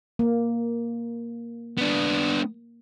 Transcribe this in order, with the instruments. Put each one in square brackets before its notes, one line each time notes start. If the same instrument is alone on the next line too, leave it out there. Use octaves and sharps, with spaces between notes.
[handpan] A#3
[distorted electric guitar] B3 D4